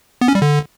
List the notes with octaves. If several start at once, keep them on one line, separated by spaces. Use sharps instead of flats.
B3
C#4
G3
D3